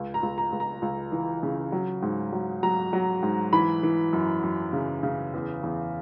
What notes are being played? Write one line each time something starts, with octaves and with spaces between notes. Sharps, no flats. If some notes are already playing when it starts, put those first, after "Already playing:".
Already playing: C#2
A#5
C#2
A#5
C#2
A#5
C#2
E3
C#3
F#3
G#2
F#3
F#3 A#5
F#3
G#2
E3 B5
E3
F#2
F#2
C#3
C#3
E2
E2